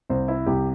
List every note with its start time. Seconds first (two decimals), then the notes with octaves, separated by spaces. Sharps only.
0.10 C2 C5
0.28 E4
0.46 C2 G4